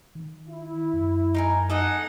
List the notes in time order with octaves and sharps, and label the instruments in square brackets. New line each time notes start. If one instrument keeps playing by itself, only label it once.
[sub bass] D#3
[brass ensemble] E4
[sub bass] F#2
[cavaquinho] D#4 A#4 G#5
[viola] D#4 F#5 [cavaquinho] A4 D#5 G#5